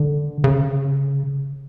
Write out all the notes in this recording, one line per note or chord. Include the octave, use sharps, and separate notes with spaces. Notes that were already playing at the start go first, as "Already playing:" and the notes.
Already playing: D3
C#3